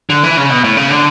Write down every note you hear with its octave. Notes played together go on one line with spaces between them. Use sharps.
D3
E3
C#3
B2
A2
C#3
D3